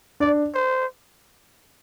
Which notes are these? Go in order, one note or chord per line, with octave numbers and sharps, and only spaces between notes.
D4 D5
C5